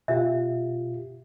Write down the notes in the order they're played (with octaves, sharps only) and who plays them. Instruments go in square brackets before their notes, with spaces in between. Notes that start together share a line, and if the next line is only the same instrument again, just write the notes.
[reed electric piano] B2 F4 G4 [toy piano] E5